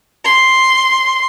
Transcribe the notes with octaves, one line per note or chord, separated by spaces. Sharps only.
C6